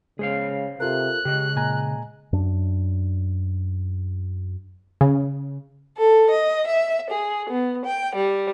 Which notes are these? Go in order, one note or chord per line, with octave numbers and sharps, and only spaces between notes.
C#3 G#3 G#4 C5 F5
C3 F4 A4 A#4 F#6
C#3 G#3 G4 D#5
A#2 G#5 A#5
F#2 D4
C#3
A4
D#5
E5
G#4
B3
G5
G3